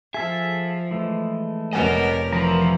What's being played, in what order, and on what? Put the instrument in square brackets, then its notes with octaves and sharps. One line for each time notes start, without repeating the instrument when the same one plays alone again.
[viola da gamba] F3 [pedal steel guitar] G#4 A4 F5 [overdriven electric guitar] E5
[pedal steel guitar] E3 G#3 A3
[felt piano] F1 F#5 G#5 [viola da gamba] G4 A#4 C#5 [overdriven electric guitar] B4 D#5
[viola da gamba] E3 [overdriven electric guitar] F3 [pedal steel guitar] A#4 A#5